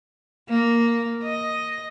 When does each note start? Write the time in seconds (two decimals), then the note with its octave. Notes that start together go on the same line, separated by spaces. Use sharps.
0.49 A#3
1.24 D#5